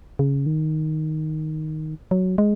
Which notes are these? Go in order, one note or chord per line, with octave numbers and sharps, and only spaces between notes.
C#3
D#3
F#3
G#3